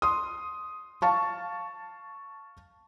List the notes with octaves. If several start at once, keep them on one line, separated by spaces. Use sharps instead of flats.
C6 D#6
F5 A5 C#6